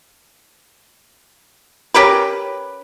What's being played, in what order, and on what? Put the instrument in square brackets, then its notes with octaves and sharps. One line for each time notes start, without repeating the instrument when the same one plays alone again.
[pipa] C#4 G4 A#4 B4